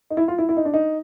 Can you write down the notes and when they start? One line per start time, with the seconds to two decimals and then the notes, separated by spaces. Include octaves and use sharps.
0.10 D#4
0.17 E4
0.28 F4
0.38 E4
0.49 E4
0.57 D#4
0.65 D4
0.74 D#4